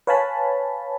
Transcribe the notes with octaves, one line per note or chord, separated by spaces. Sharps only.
B4 C#5 F5 G#5 A5 B5